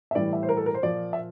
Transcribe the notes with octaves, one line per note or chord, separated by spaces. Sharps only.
E5
A2 E3 G3 D5
E5
C5
A#4
A4
A#4
C5
A#2 F3 D5
E5